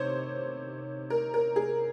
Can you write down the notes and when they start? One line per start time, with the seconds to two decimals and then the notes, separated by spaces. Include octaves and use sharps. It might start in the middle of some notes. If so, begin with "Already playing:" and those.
Already playing: C3 D#3 C5 C#5
1.10 A#4
1.34 A#4
1.56 G#4